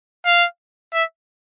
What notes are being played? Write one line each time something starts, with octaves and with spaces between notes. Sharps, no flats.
F5
E5